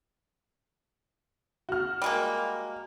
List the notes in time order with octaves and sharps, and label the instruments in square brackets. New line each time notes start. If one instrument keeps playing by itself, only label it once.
[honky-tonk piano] F#4 F6
[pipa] G3 G#3 A#3